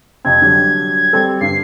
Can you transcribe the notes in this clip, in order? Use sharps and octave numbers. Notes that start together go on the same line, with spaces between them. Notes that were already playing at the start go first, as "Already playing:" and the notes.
F2 C3 C4 G#6
D3 F#3 G3
G3 C4 A4
G2 D3 C7